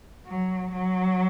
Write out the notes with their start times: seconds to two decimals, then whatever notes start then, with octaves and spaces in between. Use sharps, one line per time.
0.27 F#3
0.72 F#3